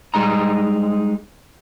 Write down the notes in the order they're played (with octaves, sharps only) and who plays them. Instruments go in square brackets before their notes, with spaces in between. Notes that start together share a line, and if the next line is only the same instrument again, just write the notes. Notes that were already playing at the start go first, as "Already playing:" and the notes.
[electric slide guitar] G3 G#3 D#4 A#5